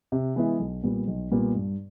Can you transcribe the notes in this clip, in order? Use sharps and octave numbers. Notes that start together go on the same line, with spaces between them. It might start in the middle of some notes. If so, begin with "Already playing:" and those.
C3
E3 G#3 B3 E4
B1
A#2 G3 B3
B1
A#2 G3 B3
G2